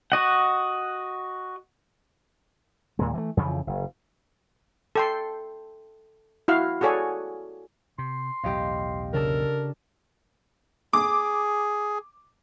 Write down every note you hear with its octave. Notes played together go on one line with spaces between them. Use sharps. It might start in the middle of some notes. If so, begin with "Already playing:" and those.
F#4 D#5 F#5
D#2 A#2 G#3
E3 G3 A3
F2 C#3 E3 F3
F#1
A4 G5 C6
E4 F#4 F5
F#4 G#4 A4 C#5 D5 G#5
C3 C6
B1 E2 A2 G4 D#5 F5
C#3 D4 A4 A#4
G#4 D6